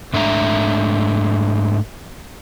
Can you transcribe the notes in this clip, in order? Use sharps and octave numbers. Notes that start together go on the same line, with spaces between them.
G#2 A3 D4 E5 A#5